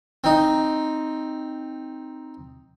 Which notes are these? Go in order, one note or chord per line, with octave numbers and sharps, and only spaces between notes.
C4 D#4